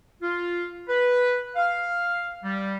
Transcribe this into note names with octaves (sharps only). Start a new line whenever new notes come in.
F4
B4
F5
G3